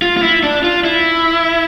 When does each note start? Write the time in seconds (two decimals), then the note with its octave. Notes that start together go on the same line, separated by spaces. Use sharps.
0.02 F4
0.17 F4
0.23 E4
0.43 D4
0.64 F4
0.85 E4